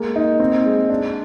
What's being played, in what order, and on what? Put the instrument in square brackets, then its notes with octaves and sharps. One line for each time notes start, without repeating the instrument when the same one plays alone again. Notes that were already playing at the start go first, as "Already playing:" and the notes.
Already playing: [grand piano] G#3 A#3
D#4
C4
G#3
D4